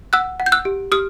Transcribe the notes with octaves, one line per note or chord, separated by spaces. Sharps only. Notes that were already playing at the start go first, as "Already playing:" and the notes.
F#5 E6 F#6
F#5
G6
E6 F#6
G4
G4 D#6 F6